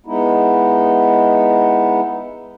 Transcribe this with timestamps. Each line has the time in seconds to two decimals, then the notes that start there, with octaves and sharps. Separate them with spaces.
0.06 G#3 B3 D#4 E4